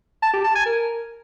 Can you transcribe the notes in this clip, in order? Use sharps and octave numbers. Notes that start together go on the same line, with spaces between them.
A5
G4
A5
G#5
A#4